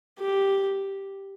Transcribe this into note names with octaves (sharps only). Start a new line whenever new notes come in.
G4